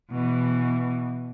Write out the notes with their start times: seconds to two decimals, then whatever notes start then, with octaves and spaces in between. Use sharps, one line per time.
0.10 B2 E3